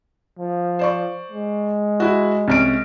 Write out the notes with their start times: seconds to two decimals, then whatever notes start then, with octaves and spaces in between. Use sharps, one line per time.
0.39 F3
0.79 C5 D5 C#6
1.32 G#3
2.00 E4 F#4
2.48 C2 C#4 D7